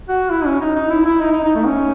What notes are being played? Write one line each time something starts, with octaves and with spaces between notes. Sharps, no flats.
F#4
E4
C#4
D#4
D#4
E4
E4
D#4
D#4
D#4
A3
C#4